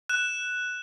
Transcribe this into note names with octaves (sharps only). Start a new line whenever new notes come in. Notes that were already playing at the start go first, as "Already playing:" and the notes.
F#6 E7